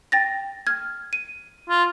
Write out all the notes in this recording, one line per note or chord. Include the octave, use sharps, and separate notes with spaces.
G5 A6 A#6
F6 G#6
D#7
F4